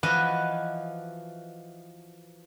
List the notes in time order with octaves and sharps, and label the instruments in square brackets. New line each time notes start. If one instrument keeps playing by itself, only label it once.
[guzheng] E3 F3 F#4 B4 D#5 G#5